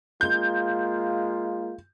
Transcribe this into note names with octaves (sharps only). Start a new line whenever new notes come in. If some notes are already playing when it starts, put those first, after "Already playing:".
G#3 A#3 F4 G6